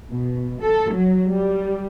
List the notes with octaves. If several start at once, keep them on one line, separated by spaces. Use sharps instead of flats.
B2
A4
F#3
G3